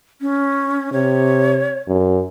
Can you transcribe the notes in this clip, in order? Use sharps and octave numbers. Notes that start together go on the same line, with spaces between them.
C#4
C3 C#5
F#2